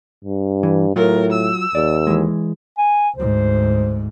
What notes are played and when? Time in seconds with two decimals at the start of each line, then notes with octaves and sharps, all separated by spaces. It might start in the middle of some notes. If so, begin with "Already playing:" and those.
0.25 G2
0.63 E3
0.96 A2 F#3 F4 A#4
1.32 E6
1.75 D#2 D5
2.07 E3 G#3
2.78 G#5
3.16 D2 G#2 C5